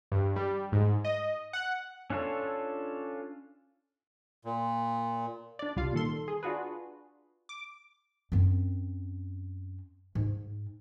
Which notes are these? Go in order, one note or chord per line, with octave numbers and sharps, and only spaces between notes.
G2
G3
G#2
D#5
F#5
C#4 D4 F4 A4 C#5
A#2
D4 D5
C2 G3 F4 F5
A#2 D#3 A4 C6
G#4
D4 F4 F#4 G#4 B4
D6
F#2 C4
G#2